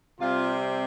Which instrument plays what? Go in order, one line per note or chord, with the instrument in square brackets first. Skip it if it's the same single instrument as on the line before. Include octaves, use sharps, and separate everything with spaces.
[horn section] C3 G3 C4 F4